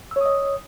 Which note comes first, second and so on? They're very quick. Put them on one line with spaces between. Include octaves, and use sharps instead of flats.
E6 C#5 D#6 D#5